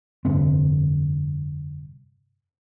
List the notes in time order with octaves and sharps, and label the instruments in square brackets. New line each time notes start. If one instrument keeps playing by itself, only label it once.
[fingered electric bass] F1 G2 D3 C4